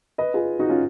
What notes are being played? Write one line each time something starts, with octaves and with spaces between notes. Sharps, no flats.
B4 D#5
F4 G#4
D#4 F#4
C#4 F4